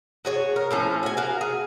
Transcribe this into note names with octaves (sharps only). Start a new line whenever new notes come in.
F#4 G#4 C#5
A#4
A2 F3 C#4
F#4 G#5
F#4 A#4 F5
G#4